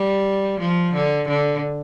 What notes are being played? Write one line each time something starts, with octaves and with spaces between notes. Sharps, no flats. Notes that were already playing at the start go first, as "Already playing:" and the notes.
Already playing: G3
F3
D3
D3